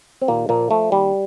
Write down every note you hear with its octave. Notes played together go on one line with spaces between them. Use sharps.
C4
D#2 A#2 A#3
A#2 F3 A#3
F3 A3
D#2 G3